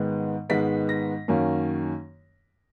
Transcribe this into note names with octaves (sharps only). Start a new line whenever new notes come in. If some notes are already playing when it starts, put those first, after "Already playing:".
Already playing: G#2 D#3 G#3 B3
G#2 D#3 G#3 B3 B6
A#6
F#2 D#3 A#3 C#4